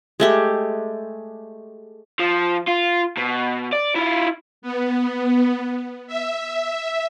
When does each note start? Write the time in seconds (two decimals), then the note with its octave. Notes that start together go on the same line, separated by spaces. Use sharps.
0.20 G#3 A3 G4
2.20 F3
2.68 F4
3.18 B2
3.73 D5
3.96 E4 F4
4.62 B3
6.07 E5